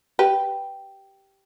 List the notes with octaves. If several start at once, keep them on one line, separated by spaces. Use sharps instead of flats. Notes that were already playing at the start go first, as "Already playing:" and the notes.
G4 B4